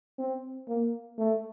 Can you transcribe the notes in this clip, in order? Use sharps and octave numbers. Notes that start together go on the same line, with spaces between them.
C4
A#3
A3